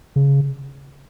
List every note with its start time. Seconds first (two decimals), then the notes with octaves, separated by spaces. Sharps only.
0.16 C#3